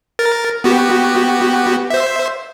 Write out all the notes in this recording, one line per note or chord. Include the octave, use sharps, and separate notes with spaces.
A#4 A6
B3 F#4 G4
C5 E5